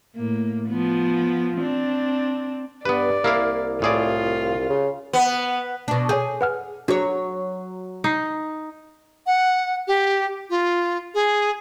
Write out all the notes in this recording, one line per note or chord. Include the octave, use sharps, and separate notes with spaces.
A2 A#3
F3 B3
C4 D4
G2 B3 B4 D5
C2 A#3 E4 F5
A2 F4 G#4 D5
C#3
B3
B2 D4
G#4 C#5 G#5 G6
B4 F#5 F6
F#3 D4 F#4 G#4 C#5
D#4 D#6 C7
F#5
G4
F4
G#4